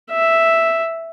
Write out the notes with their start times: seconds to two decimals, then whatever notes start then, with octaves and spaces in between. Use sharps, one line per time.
0.11 E5